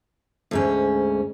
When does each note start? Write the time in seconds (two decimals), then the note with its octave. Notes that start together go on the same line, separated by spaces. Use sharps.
0.51 D2 G#2 C#4